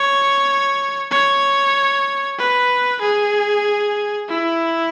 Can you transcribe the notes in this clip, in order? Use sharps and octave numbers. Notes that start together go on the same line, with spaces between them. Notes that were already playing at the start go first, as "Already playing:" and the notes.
Already playing: C#5
C#5
B4
G#4
E4